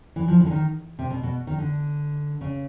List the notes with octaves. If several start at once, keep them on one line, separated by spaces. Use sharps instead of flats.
E3
F3
E3
D3
D#3
C3
B2
B2
D#3
D3
C#3